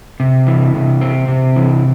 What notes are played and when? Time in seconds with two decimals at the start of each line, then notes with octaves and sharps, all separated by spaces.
0.20 C3
0.47 E3
0.74 C3
1.01 C4
1.28 C3
1.56 E3